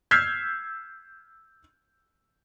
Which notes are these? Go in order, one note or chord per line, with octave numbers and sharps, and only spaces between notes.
E6 F6 G6 G#6 B6 C7